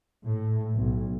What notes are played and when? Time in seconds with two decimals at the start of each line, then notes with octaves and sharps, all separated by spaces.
0.23 A2
0.74 B1